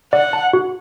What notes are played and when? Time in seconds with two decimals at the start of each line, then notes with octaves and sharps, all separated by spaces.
0.13 D5 F#5
0.33 A5
0.53 F#4